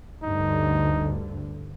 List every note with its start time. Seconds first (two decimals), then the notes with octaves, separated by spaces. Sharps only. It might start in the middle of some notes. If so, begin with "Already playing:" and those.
0.23 D2 G2 D3 D#4